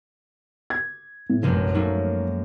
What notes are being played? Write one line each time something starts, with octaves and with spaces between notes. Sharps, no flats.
G#6
A2
F1 A#1 F#2 G#3
F#3 A3 A#3 D#4